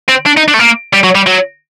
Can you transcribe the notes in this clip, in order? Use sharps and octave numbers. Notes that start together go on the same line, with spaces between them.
C4
D4
D#4
D4
A3
A#3
G3
F#3
G3
F#3